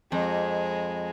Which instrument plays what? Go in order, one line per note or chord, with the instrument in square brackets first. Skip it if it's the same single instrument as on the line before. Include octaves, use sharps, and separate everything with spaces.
[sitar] F2 [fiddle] G#3